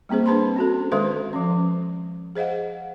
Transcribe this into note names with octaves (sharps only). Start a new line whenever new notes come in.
G3 A#3 C4 G#4 C5
D4 B4 C5 A5 B5 C6
C#4 F#4 A4
D#3 G#3 A4 B4 C5 F5
F3 C#4
G#4 C5 D#5 F5 F#5